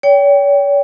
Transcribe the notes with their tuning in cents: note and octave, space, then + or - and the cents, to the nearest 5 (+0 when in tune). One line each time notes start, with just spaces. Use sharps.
C#5 +40 G5 +0